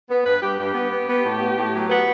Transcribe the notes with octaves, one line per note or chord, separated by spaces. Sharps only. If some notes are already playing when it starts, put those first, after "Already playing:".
B3
G2 B4
G2 G4
G2 G4
B3
B3
B3
A2
B3
A2
F#3
B3 B4